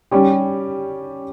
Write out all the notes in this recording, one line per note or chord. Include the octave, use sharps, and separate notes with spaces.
G3 C#4 G4